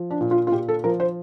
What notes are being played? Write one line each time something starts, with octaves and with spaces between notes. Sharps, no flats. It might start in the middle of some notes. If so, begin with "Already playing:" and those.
Already playing: F3
D4
A#2
F4
F4
A#2 G4
A4
F3 A#4
C5